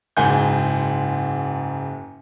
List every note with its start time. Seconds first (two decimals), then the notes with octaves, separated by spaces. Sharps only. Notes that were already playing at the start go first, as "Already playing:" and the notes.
0.17 F#1 G#2 G#5 G6